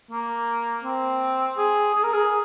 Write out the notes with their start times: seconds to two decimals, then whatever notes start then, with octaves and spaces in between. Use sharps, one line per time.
0.11 A#3
0.84 C4
1.57 G#4
1.95 G#4
2.03 A#4
2.14 G#4